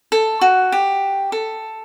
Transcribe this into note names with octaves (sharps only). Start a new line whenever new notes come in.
A4
F#4
G4
A4